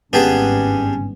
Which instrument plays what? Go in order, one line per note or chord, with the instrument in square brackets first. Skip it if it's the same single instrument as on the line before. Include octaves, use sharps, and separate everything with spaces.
[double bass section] G#1 G2 [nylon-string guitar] B3 [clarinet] C#4 [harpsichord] D4 G4 G#4